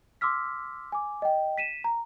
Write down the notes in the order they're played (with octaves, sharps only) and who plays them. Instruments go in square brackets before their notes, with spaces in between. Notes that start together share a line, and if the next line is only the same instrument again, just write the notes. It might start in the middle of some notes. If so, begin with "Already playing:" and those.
[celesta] C6 D6 E6 F6 B6
G#5 D6
D#5 G5
B6 D#7 E7
A#5